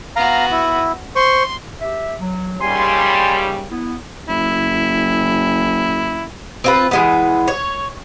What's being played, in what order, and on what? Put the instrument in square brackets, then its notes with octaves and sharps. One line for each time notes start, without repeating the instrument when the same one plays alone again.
[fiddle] B3 F#4 [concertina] F5 A#5
[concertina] E4
[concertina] C5 C#6 [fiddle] C6
[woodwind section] G4 E5
F#3
[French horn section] D#2 C#3 G3 [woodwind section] G#5 C6
[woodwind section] B3 E4
[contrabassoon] F#1 [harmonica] E4
[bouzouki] C4 F4 B4
E3 G#3 B3
C#5